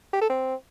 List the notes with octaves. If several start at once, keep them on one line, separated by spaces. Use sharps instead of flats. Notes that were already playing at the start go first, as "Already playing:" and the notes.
G4
A4
C4